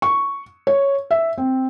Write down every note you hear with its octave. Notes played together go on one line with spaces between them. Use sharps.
C#6
C#5
E5
C4